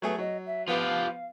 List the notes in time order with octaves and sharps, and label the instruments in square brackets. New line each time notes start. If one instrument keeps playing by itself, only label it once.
[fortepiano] F#3 A3 G#4 [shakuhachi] B4
[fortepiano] F#3 [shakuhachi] D#5
[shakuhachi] E5
[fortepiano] F3 B3 B4 [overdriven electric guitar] F4 G4 [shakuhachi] F5